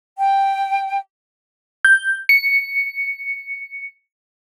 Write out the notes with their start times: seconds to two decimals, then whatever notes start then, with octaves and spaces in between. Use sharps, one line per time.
0.18 G5
1.85 G6
2.29 C#7